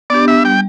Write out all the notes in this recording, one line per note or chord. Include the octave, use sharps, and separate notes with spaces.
B3 D4 G4 D5
E5
G3 G5